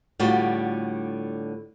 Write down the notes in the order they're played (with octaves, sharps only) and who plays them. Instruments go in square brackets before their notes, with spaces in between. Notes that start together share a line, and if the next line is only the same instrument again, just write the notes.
[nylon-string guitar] A2 D3 G3 F4 F#4